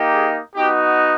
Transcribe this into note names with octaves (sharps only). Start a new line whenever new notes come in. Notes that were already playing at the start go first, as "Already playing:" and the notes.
Already playing: A#3 D#4 G4
G#4
B3 D#4 F#4 G4